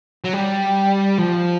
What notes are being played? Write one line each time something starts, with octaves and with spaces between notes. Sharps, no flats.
F#3
G3
F3